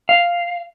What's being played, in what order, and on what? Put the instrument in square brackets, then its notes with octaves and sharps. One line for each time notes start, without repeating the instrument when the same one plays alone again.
[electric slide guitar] F5